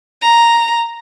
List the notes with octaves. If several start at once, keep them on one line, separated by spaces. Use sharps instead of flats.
A#5